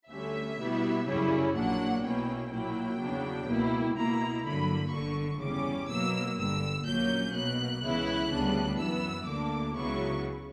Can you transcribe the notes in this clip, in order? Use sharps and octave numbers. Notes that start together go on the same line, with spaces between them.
D2 D3 G3 C#4 E5
B2 G3 B3 E4
F#2 C#3 G3 C#4 E4
A#1 A#2 F#3 A#3 D4 F#5
B1 B2 A#3 C#4 E4 G5
A#2 F#3 A#3 E4 G5
E2 C#3 F#3 B3 D4
C#2 B2 A#3 E4
B2 A#3 E4 A#5
G2 D3 F#3 A#3 B5
G1 G2 D3 C#6
E2 C#3 G3 C#4 D6
B2 F#3 A#3 E6
G1 G2 D3 E6
A#1 A#2 F#3 A#3 C#4 G6
B1 B2 A#3 F#6
C#2 C#3 E3 B3 E4 F#6
D2 C#3 G3 B3 D4
F#2 E3 B3 E6
D2 D3 A#3 D4 D6
C#2 C#3 F#3 B3 E4 C#6